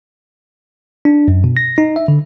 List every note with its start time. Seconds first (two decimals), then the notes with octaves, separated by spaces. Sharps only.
1.05 D4
1.28 F#2
1.44 B2
1.57 A#6
1.78 D#4
1.96 E5
2.08 D3